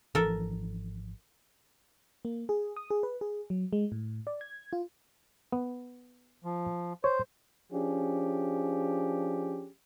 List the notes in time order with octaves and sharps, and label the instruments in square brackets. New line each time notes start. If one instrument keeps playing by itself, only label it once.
[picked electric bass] G#1 E3 F3 [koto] A4 A#4
[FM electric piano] A#3
G#4
D#6
G#4
B4
G#4
F#3
G#3
A2
D5
G#6
F4
[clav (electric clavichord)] B3
[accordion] F3
[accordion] C5 [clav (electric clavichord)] C#5
[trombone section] F3 C#4 D4 G4 G#4